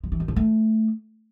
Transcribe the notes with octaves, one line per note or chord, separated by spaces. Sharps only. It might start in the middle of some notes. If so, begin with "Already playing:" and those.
F3
E3
D#3
A2
A3